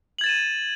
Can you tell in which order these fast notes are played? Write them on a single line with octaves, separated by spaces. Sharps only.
F#7 G#6 A6 E7 D#7